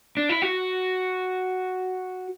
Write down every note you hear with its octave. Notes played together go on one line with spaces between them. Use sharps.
D4
E4
F#4